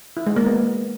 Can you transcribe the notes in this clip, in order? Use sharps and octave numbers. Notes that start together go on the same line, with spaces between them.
E4
G#3
A#3
B3